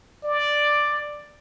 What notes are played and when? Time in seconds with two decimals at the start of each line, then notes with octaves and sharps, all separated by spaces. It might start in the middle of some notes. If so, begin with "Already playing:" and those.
0.24 D5